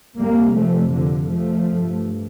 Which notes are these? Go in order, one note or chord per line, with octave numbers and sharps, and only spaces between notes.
F2 C3 G3 A#3
F3 A3
D3 F3
F3 A3
G2